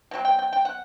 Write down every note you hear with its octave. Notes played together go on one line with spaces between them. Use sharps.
B2 F#3 C4
G5
G5
G5
F#5